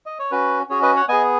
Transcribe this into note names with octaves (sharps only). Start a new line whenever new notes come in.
D#5
C#5
C#4 F#4 B4
C#4 F#4 G#4 C#5
B4 D#5
C#5 F#5
B3 G#4 D#5 G#5